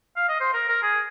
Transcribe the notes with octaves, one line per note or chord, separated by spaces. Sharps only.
F5
D#5
C5
A#4
A#4
G#4